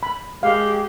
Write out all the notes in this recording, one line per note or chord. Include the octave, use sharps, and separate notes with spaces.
B5
G#3 G4 F5